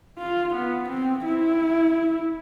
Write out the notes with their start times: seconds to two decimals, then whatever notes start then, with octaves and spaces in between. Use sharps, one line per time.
0.19 F4
0.54 B3
0.89 C4
1.25 E4